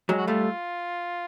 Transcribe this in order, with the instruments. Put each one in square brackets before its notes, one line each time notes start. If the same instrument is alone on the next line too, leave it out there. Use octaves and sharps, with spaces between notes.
[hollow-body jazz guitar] F#3 G#3
[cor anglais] F#4
[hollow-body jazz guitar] G3 A3 [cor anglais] F4